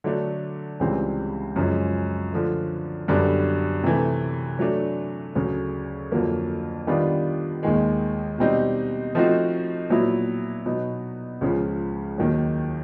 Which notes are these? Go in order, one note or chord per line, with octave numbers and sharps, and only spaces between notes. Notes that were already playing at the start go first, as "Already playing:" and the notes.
D3 F#3 A3 D4
C#2 C#3 E3 G3 C4
F#2 C#3 F3 G#3 C#4
D3 F3 A3
F#2 D3 G3 B3 D4
C3 E3 A3
F#3 A3 D4
D2 C#3 F#3
F2 D3 F#3 A#3
D#3 G3 B3 D4 F4
D#2 D#3 G#3
B2 G3 C4 D#4
F3 A3 C4 D#4 F#4
A#2 F#3 B3 E4
B2 F#3 B3 D#4
C#2 C#3 F3
D#2 D#3 F#3